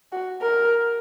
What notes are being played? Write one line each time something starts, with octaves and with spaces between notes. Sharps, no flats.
F#4
A#4